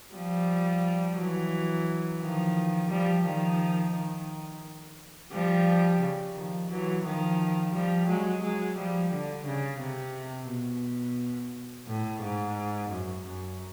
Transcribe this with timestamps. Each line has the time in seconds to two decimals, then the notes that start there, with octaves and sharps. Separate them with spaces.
0.15 F3 G3
1.19 E3 F#3
2.21 D#3 F3
2.91 F3 G3
3.25 D#3 F3
3.94 D#3
5.32 F3 G3
6.01 C#3
6.36 D#3 F3
6.70 E3 F#3
7.04 D#3 F3
7.74 F3 G3
8.08 F#3 G#3
8.43 F#3 G#3
8.77 F3 G3
9.12 D3
9.46 C#3
9.80 C3
10.50 B2
11.88 A2
12.22 G#2
12.91 F#2
13.26 F#2